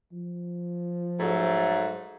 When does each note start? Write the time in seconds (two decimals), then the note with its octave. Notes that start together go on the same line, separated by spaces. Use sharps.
0.13 F3
1.20 G#2 F#3 A3